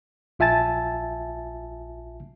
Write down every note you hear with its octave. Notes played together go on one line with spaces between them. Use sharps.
A#1 F4 E5 G#5 A5 A6